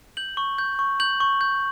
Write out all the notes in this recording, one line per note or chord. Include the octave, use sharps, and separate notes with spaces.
G6 F#7
C#6
G6
C#6
G6 F#7
C#6
G6